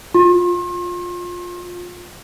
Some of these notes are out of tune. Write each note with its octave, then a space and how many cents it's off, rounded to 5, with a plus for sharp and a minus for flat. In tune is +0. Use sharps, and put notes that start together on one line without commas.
F4 +15 C6 +40